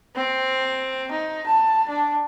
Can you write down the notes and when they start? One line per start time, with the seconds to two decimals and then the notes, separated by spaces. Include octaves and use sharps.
0.15 C4
1.11 D#4
1.46 A5
1.89 D4